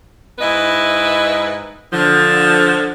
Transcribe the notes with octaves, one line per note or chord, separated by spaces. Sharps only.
G#2 E4 B4 D#5
D3 F3